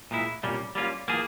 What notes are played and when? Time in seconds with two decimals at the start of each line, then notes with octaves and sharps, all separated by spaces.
0.11 A#2 G#3 E4
0.43 C2 A#2 G3 A#3 C#4
0.75 G3 A#3 C#4 F4
1.08 E3 A#3 F4 G#4